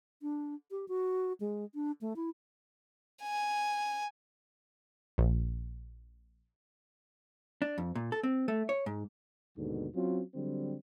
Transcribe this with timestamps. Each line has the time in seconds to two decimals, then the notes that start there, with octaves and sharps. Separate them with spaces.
0.22 D4
0.71 G4
0.88 F#4
1.40 G#3
1.75 D4
2.01 A3
2.16 E4
3.23 G#5
5.18 A#1
7.62 D4
7.78 F2
7.95 A#2
8.12 A4
8.23 C4
8.48 A3
8.69 C#5
8.86 G#2
9.56 D#2 G#2 B2 D3
9.94 F#3 C4 C#4 F4
10.34 D3 F#3 G3 C4